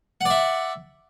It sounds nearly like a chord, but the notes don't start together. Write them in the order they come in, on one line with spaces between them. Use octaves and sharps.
F#5 D5 E5